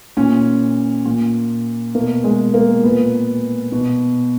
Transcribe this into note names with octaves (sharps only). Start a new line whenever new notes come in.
A#2 C#4
A#2
B2 A#3
G#3
A#3
A#2 B3
B2